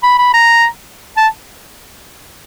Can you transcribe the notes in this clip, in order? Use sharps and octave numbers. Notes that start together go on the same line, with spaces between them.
B5
B5
A#5
A5